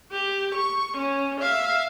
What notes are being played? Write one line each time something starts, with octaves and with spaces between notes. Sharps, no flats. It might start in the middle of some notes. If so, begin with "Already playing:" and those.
G4
C#6
C#4
E5 F5